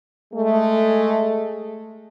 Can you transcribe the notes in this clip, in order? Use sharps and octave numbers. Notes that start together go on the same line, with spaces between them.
G#3 A3